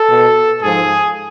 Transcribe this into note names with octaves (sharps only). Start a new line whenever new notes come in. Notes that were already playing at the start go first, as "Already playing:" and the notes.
Already playing: A4
B2
G#2 F3 G#4